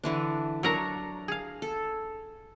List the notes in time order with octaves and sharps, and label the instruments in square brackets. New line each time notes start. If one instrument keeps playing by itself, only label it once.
[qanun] D3 E3 D4
[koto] F#3 A#4 A#5 [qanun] D4 C#5
[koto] G#4 F5
[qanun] A4